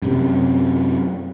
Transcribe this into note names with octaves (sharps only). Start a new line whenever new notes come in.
F#2 C3